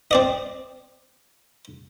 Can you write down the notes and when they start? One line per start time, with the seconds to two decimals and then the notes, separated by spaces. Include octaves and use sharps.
0.11 C4 D5 D#5